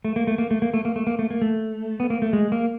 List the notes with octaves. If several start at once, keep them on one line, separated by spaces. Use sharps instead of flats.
A3
A#3
A3
A#3
A3
A#3
A3
A#3
A3
A#3
A3
A#3
A3
B3
A#3
A3
G#3
A#3